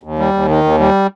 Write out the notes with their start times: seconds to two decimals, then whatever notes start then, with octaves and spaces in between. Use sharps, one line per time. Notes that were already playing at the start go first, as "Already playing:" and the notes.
0.03 D#2
0.19 G3
0.34 D#2
0.49 D#3
0.64 D#2
0.80 G3